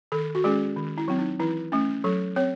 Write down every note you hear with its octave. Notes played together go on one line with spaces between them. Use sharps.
D#3 A4
F#4
G#3 C#4 G#4
D#3
E4
F#3 C4
D#4
E3 E4
A3 C#4
F#3 A4
C4 C#5